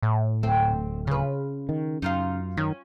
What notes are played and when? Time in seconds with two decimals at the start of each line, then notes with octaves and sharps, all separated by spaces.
0.03 A2
0.43 D1 A3 C4
1.07 C#3 F4 B4
1.69 D#3
2.02 F#2 D#4 F4 F5
2.57 D#3 C#4